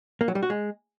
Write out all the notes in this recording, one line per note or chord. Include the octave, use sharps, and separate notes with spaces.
A#3
F#3
G3
F#4
G#3